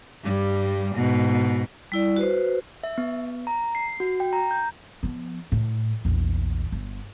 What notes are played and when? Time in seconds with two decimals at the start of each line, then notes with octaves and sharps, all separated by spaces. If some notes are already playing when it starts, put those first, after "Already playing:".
0.24 G2 G3
0.95 G#2 B2
1.92 G3 E4 D5
2.16 F#4 B4 C5
2.83 E5
2.98 B3
3.47 A#5
3.75 C7
4.00 F#4
4.20 G5
4.33 A#5
4.51 G6
5.03 F3 B3
5.52 A2
6.05 A#1 E2
6.72 G1